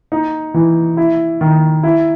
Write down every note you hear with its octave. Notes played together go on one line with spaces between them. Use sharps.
D#4
E3
E4
D#3
E4